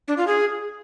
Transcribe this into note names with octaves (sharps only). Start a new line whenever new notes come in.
D4
F4
G#4